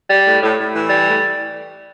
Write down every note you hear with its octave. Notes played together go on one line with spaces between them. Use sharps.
G3
A2
A2
A2
E3
G3
A2